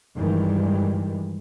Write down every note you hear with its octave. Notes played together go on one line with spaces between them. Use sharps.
G2 D#3 E3 G3 G#3